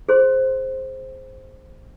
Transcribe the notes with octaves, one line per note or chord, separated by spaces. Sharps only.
G#4 C5 C6